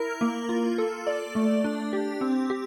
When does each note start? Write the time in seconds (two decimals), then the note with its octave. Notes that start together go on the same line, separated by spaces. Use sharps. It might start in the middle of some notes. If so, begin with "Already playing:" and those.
Already playing: E4 A#4
0.21 A#3
0.49 F4
0.78 A4
1.07 D5
1.35 A3
1.64 D4
1.93 G4
2.21 C4
2.50 G4